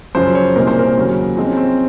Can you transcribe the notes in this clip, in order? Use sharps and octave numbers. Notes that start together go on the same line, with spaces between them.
F#2 C#3 F3 C5
C#5
C2 A#2 G#3 A#4
C5
A#4
D#2 C#3 F#3
G#2 F3 G#3 C4
C#4
C4